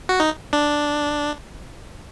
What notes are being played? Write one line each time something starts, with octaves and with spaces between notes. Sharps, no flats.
F#4
D#4
D4